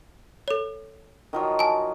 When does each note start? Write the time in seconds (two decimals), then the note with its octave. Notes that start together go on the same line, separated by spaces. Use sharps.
0.48 A4 C#5
1.33 D#3 F3 F#3
1.59 G#5 A5